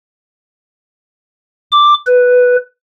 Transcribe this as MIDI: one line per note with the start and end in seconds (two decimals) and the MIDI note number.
1.72 1.94 86
2.06 2.56 71